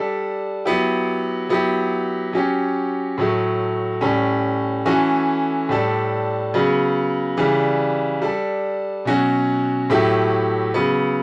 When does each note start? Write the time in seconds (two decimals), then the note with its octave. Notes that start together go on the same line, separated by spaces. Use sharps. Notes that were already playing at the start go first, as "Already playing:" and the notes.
Already playing: G3 D4 A4
0.65 F#3 B3 E4 G4
1.49 F#3 B3 E4 G4
2.33 F#3 C#4 G4
3.18 A2 F#3 A3
4.01 A2 G3 C#4
4.85 E3 A3 C#4 F#4 A4
5.69 A2 G3 D4 A4
6.54 C#3 F#3 B3
7.37 C#3 E3 G3 D4
8.22 G3 D4 A4
9.05 B2 F#3 C#4 F#4
9.90 A2 F#3 A3 E4 G4
10.74 C#3 F#3 B3